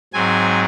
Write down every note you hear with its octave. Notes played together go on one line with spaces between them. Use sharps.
G#2 F#3 C4 G#5